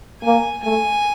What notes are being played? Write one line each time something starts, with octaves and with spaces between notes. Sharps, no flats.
A#3 G#5
A3 G#5